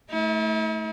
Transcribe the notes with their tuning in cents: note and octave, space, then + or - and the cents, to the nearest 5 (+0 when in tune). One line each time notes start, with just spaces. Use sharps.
A3 -5 E4 -45